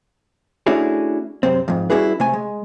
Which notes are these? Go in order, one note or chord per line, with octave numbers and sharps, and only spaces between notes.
A3 C#4 D4 E4 F#4 G#4
F#2 C3 C4
F2 G#2
G3 C#4 E4 F#4 G#4 B4
C3 A3 G#5
G#3